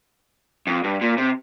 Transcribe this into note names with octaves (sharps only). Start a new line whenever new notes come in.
F2
G2
A#2
C3